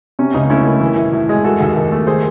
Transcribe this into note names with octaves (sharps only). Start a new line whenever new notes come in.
C3 C#4
C#2 D#4
A3 C#4 E4
D#3
E3
A2
A2
G#3
D#3 F#4 A4
D#2
D#2
A3
D#3 G#4 C5